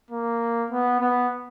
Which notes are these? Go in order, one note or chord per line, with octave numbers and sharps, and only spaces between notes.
A#3
B3
B3